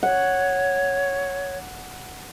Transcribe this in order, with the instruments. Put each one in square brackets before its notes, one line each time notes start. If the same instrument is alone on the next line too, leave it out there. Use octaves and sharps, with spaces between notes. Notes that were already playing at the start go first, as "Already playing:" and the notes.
[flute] C#5 [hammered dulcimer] F#5